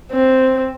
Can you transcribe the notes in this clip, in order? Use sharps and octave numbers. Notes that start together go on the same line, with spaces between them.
C4